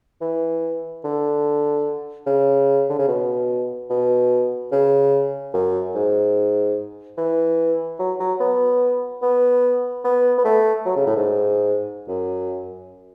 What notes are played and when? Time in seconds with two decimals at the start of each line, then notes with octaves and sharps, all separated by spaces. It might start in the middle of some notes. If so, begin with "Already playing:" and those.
0.21 E3
1.04 D3
2.26 C#3
2.90 D3
2.99 C#3
3.08 B2
3.90 B2
4.72 C#3
5.54 F#2
5.95 G#2
7.17 E3
7.99 F#3
8.20 F#3
8.40 B3
9.22 B3
10.04 B3
10.38 B3
10.45 A3
10.86 F#3
10.96 C#3
11.06 A2
11.16 G#2
12.08 F#2